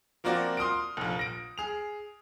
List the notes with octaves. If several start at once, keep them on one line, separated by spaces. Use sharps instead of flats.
F3 A#3 C4 F#4 D5
C6 D#6 F6 D7
F1 A#1
A#6 D7
G#4 F7